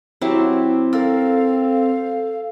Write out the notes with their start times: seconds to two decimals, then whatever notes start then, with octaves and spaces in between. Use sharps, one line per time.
0.21 F#3 C4 E4 G4
0.93 A4 A#4 F5 E6